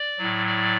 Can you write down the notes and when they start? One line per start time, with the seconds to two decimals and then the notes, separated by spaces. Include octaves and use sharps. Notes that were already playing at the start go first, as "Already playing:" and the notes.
Already playing: D5
0.18 A2 F#3
0.46 D5